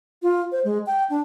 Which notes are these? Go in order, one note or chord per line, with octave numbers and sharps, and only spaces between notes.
F4
C5
G#3
G5
D4